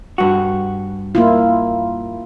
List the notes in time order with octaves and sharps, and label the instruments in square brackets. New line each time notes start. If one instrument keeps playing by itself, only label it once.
[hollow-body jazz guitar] G2 F#4
[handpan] A#3 E4 F4